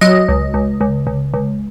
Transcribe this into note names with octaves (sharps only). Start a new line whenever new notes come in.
F#3 D#5
C#2
C#2
C#2
C#2
C#2